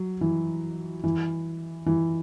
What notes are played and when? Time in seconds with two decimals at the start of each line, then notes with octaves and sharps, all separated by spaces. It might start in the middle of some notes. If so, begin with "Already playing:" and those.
Already playing: F#3
0.21 E3
1.04 E3
1.86 E3